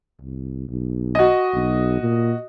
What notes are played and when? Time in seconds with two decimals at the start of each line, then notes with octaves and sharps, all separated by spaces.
0.21 C2
0.69 B1
1.15 F#4 D#5
1.54 B1
2.00 A#2